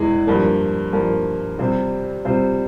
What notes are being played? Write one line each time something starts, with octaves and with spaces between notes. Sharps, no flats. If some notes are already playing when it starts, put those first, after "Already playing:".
Already playing: E2 E3 G#3 E4
G2 F3 A#3
G2 F3 A#3
C3 G3 C4 F4 C5
C3 G3 C4 F4 C5